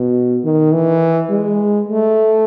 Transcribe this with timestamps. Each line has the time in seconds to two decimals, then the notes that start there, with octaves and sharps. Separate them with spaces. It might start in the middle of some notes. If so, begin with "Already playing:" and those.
Already playing: B2
0.44 D#3
0.73 E3
1.30 G#3
1.88 A3